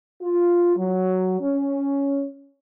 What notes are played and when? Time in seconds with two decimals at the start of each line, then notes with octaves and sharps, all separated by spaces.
0.22 F4
0.76 F#3
1.41 C#4